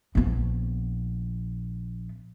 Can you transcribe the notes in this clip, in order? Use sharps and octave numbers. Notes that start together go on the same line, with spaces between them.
A#1 B3